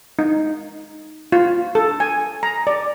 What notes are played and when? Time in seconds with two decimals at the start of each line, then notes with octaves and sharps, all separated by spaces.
0.19 D#4
1.32 F4
1.75 A4
2.00 G#5
2.43 A#5
2.67 D5